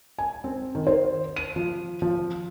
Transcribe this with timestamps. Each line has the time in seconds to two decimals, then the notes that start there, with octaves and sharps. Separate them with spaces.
0.19 G#5
0.44 C4
0.75 D#3
0.87 C5
1.36 D#7
1.56 F3
2.02 F3